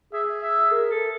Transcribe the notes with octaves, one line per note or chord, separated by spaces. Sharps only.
G#4 E5
E5
A#4
A4